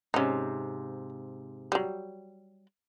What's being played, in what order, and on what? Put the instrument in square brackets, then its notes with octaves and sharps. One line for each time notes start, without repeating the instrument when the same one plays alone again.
[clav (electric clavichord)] G#2 C3 [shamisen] C#4 D#4
[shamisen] F#3 G3